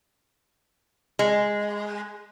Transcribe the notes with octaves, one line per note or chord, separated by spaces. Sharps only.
G#3